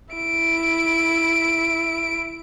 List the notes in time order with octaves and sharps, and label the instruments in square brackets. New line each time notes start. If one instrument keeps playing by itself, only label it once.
[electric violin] E4 D7